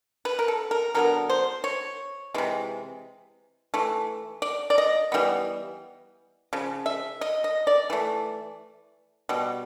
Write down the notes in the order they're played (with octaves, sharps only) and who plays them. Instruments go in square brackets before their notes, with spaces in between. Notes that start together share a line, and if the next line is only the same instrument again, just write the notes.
[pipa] B4
A#4
A4
A#4
D3 F#3 B3 A#4
C5
C#5
C3 E3 G#3
E3 A3
D5
D5
D#5
E3 G3 B3
C#3 F3
E5
D#5
D#5
D5
E3 A3
B2 G3